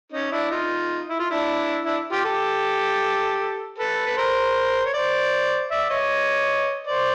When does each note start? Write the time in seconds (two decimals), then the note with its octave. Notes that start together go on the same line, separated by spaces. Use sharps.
0.13 C#4 D#4
0.32 D4 E4
0.51 D#4 F4
1.09 E4
1.20 F4
1.31 D4 E4
1.86 D4 E4
2.12 F4 G4
2.25 G4 A4
3.78 A4 B4
4.07 B4
4.17 A#4 C5
4.86 C#5
4.94 C5 D5
5.71 D5 E5
5.90 C#5 D#5
6.87 C5 D5